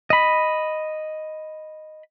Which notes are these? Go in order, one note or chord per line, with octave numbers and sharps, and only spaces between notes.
D#5 B5